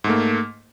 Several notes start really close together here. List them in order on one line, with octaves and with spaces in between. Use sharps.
G#2 A3 A#3